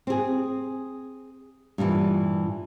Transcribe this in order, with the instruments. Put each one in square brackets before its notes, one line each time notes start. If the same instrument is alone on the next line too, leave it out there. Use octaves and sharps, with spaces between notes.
[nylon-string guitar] C4 G#4
G2 A#2 D#3 E3